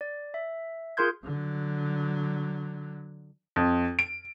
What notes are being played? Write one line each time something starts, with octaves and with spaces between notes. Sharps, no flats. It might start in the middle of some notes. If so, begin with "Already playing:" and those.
D5
E5
F4 G#4 A#4 C6 G6 G#6
D3 F#3
F2
D7